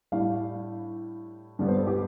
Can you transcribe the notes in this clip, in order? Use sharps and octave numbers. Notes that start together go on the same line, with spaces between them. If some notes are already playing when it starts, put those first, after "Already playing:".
A2 G3 D4 F5
G2 D3 G3 B3
C5
A4
G4